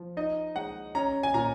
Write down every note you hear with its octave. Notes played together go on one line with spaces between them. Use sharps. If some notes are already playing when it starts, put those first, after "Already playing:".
Already playing: F3
D#4 D#5
G#3 F#5
C#4 A#5
G#5
A#2 A#5